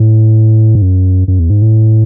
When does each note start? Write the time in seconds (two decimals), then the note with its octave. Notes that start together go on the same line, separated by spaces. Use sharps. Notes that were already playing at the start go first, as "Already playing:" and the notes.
Already playing: A2
0.75 G#2
0.82 F#2
1.28 F#2
1.39 E2
1.50 G#2
1.62 A2